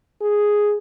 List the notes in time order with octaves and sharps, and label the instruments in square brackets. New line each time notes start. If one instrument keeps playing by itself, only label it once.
[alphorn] G#4